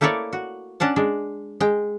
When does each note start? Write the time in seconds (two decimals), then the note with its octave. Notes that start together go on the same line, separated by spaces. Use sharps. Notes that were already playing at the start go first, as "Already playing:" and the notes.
0.01 A3 A#3 E4 A4 C#5 D5
0.33 F#4
0.80 C#4 D4 F#5 A5
0.96 G#3 D4
1.60 G#3 G5